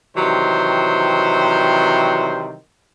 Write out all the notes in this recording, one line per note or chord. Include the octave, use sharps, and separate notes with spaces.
C3 D#3 E3 F#3 G3 C5